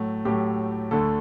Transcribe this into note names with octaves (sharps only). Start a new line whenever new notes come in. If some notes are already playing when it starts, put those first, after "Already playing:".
Already playing: A2 F#3 A3
A2 F#3 A3 G4
D2 D3 A3 A4